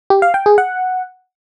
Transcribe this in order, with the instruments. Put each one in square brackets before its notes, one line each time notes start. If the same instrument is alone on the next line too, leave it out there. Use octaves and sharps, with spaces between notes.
[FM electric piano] G4
F5
G5
G#4
F#5